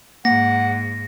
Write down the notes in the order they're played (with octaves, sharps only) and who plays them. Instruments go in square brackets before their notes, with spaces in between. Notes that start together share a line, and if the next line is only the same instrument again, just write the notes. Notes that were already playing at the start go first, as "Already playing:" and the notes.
[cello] G#2 [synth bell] A#3 [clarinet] F#5 [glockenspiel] A#6